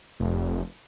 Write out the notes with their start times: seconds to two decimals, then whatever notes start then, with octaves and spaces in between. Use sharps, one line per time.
0.20 F1